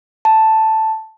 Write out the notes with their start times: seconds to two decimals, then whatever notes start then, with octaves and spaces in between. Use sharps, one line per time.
0.25 A5